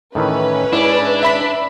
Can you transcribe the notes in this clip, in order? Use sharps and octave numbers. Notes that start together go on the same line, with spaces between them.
A2 D#3 E3 C#4 B4
G#2 D4 E4
E5 B5 B6